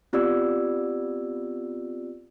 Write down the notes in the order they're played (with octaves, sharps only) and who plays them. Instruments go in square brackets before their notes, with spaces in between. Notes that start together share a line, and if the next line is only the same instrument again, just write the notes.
[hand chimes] B3 C4 F4 G4 D5 E6